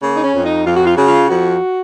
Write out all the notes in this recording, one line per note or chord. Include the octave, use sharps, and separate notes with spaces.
C#3 A#3
D#4
C#4
F2
D#4
F2 F4
F#4
F4
C#3 F#4
F4
F2 F#4